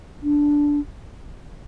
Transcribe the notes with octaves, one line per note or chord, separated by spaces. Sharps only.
D4